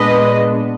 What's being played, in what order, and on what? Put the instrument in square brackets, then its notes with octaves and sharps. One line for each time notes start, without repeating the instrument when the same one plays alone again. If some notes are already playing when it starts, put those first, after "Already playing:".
Already playing: [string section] A#2 G#3 B3 D4 B4 D#5